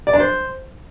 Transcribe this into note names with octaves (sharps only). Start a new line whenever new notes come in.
D5
D4
C5